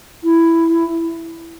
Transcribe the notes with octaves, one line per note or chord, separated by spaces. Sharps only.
E4